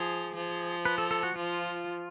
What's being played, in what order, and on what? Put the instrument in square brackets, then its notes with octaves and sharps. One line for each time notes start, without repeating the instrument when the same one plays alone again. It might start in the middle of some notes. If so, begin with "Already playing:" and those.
Already playing: [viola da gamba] F3 [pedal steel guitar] G#4
[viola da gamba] F3
[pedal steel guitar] B4
A4
A4
F#4
[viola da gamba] F3 [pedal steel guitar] F4